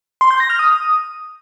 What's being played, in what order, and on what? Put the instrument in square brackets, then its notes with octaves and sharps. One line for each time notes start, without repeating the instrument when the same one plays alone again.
[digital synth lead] C6
G6
A#6
F6
D#6